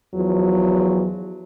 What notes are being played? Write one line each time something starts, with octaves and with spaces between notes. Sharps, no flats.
E2 F3 F#3